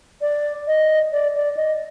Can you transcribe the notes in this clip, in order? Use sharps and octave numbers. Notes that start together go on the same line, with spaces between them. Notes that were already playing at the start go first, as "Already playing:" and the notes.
D5
D#5
D5
D5
D#5